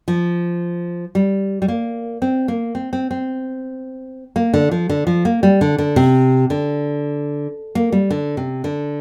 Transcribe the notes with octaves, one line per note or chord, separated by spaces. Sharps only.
F3
G3
G3
A#3
C4
A#3
C4
C4
C4
A#3
D3
F3
D3
F3
A#3
G3
D3
D3
C3
D3
A#3
G3
D3
C3
D3